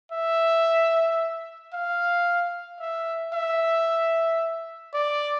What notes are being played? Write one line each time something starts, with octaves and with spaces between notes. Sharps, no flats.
E5
F5
E5
E5
D5